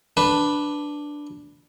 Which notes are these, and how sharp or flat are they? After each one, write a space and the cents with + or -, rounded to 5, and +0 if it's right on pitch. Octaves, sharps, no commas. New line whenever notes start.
D4 +0 B4 +0